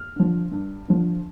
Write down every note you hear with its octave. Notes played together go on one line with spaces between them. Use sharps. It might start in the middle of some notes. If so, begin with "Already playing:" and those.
Already playing: F6
D3 F3
G2
D3 F3